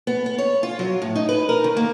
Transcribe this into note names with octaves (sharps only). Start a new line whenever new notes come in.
B3
B3
C#5
F4
F#3
A2
D#4
B4
A#4
D#3
A#3